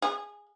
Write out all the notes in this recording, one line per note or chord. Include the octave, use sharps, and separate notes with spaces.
G#4